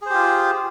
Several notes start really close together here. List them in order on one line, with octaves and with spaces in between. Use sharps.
G#4 C5 G4 F4